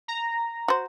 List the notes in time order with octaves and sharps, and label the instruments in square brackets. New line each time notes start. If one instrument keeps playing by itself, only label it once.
[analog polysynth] A#5
[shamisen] F#4 C5